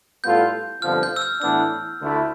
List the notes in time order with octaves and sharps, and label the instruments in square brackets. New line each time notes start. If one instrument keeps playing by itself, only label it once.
[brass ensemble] A2 G3 B3 F4 A4 [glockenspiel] G6
[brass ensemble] G1 F2 D3 F3 [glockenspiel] F6
[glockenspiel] G6
E6
F6
[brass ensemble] A2 E3 B3 D4 [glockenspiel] E6
[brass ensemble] D2 D3 A3 E4